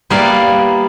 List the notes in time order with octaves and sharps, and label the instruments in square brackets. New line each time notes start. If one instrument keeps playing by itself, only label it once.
[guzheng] G3 A#3 B3 E4 D5 F5